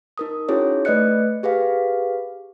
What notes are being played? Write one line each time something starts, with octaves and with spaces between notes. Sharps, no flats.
D#4 A#4 D#6
C#4 D#4 E4 F#4 G#4 C#5
A3 B4 D5 D#5 F#6 C#7
G4 G#4 B4 F5